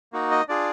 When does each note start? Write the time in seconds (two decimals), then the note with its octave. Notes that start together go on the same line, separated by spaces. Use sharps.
0.13 A#3 D#4 F#4
0.31 D#5
0.49 D4 F4 G#4 D5